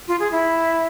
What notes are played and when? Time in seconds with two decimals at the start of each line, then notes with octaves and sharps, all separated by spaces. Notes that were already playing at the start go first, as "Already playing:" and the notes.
0.08 F4
0.20 G#4
0.32 E4